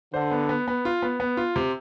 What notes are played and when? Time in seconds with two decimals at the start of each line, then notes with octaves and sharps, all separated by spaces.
0.14 D3 C5
0.31 B3
0.49 B3
0.68 B3
0.85 F4
1.02 B3
1.20 B3
1.37 F4
1.56 C3